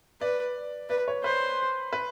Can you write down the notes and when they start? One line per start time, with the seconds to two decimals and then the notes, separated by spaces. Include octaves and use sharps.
0.21 B4 D5
0.90 B4 D5
1.08 C#5
1.24 B4 C5
1.93 B4